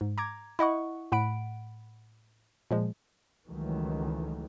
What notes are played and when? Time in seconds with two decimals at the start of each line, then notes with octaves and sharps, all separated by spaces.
0.01 G#2
0.18 A#5 D6 G#6
0.59 E4 D#5 F#5 C#6
1.12 A2 F#5 B5 D7
2.71 A#2 F3 G#3
3.49 C#2 D#3 E3 F#3 A3